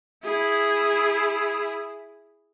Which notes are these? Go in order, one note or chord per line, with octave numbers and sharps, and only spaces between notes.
E4 G#4